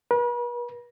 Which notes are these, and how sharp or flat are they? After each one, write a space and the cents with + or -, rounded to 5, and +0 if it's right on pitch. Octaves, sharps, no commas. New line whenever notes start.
B4 -40